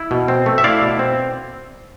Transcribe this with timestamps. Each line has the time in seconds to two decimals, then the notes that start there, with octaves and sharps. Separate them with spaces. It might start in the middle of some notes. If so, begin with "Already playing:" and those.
Already playing: E4
0.11 B2
0.28 C4
0.46 A3
0.58 E5
0.64 E4 D5 F5
0.81 B2
0.99 C4